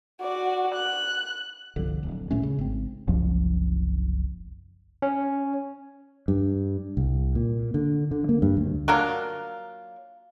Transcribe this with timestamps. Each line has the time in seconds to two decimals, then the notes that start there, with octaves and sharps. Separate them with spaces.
0.22 F#4 D5
0.74 F#6
1.76 G1 C2 D3 F3
2.03 D1
2.31 A1 A#2 A3 C#4
2.43 C#3
2.59 G#1 C4
3.08 F#1 C2 F3
5.02 C#4
6.28 G2
6.97 C2
7.35 A#2
7.74 D3
8.11 D3
8.29 A#3
8.42 G2
8.57 D2
8.88 F#3 A#3 D4 F4